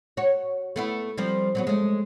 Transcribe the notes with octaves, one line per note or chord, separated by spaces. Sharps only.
F#4 C#5
A3 B3 E4
F3 G3 C4
F#3 G3 B3
G#3 A3